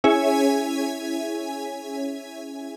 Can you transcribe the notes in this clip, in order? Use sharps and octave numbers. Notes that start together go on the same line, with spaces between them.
C#4 E4 G#4 C#5 E5 G#5